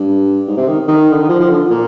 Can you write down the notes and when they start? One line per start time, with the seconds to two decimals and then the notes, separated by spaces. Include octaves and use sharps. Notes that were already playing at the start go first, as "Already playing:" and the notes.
Already playing: G2
0.47 G#2
0.57 C3
0.68 D#3
0.88 D#3
1.13 D3
1.21 D#3
1.29 F3
1.40 F3
1.49 D3
1.70 A#2